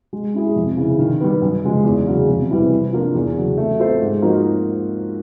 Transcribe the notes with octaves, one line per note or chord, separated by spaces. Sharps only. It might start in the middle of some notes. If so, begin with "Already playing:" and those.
G#3
C#4 E4 G#4
F2
C#3 E3
D#3
G3 B3
F#2
C#3 F3 G#3
E2
C#3 F#3
F2
C3 E3 G3 B3
C3
F3 A#3 D4 F4
E2
C#3 F#3
A3
C4 F4 A4 C5
G#2
F3 A#3 D#4 F#4